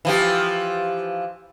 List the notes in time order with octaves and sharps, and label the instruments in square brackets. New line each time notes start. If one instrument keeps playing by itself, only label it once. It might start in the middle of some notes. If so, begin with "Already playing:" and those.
[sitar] E3 F3 G4